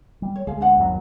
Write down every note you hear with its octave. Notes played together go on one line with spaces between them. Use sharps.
G3
C#5
D2 G#3 G#4 F5
D4 C5 F#5
G1 D#2 F#3